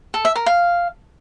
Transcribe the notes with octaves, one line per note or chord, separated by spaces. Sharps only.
A4
E5
A#4
F5